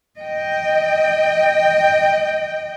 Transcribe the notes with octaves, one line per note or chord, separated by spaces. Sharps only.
D#5 G5